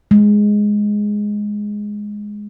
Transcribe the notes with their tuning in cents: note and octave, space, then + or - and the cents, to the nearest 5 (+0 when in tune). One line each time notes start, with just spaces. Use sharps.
G#3 +0